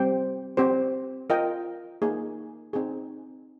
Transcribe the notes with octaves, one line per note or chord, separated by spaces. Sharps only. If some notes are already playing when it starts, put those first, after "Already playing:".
Already playing: G3 C4 G4 C5 G5
C4 G4 C5
F4 A#4 D#5 G5
A#3 D#4 G#4
C4 D#4 G#4